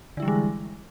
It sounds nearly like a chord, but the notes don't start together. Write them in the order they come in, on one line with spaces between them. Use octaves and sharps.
D3 E4 G3 E3 G#3